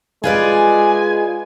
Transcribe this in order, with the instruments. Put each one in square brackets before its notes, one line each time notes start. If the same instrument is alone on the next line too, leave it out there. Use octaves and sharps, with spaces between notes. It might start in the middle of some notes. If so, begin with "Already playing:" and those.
[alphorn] G#3 [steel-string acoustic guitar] F4 B4 D5 [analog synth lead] G#5